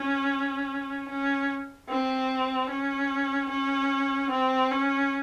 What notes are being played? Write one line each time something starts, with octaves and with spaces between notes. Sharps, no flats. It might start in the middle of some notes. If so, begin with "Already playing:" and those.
Already playing: C#4
C#4
C4
C#4
C#4
C4
C#4